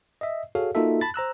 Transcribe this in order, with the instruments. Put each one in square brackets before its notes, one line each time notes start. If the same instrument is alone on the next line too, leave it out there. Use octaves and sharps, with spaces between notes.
[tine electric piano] D#5 E5
F#4 G#4 A4 C#5 F5
A#3 D#4 F4 F#4 A4 E5
A5 B5 A6
C5 A#5 E6 F#6